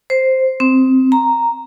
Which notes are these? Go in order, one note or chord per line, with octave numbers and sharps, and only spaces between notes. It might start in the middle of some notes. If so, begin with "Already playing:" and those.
C5
C4
A#5